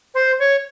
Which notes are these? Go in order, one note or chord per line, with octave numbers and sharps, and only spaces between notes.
C5
C#5